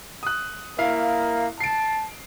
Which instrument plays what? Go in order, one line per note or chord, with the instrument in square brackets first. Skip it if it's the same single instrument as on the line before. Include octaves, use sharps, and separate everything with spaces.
[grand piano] D#6 F#6
[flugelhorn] A#3 [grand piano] E4 F5
[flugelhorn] A5 [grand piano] C7 D7